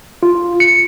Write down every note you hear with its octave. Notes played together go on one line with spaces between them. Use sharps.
F4
C#7